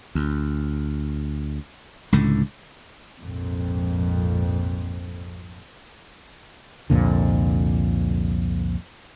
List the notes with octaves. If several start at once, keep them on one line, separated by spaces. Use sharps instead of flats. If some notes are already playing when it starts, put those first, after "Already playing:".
D2
C#2 A2 D3
A#1 F2 G#2
C2 F2 A#2 D3